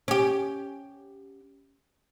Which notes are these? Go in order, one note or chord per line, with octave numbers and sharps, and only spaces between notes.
C#4 G4